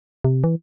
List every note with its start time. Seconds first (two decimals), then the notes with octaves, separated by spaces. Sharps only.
0.24 C3
0.44 E3